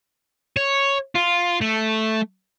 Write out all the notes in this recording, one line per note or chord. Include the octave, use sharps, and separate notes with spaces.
C#5
F4
A3